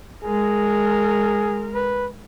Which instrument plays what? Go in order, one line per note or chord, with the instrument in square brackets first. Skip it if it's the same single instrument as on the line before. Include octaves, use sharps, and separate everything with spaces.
[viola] G#3 A#4 [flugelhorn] G#4
[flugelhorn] B4